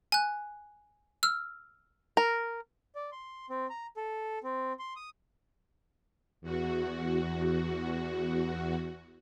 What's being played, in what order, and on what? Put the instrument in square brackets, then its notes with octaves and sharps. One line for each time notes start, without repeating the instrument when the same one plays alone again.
[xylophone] G#5 F#6
E6 F6
[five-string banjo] A#4
[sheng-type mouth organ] D5
C6
C4
A#5
A4
C4
C6
D#6
[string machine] E2 F#4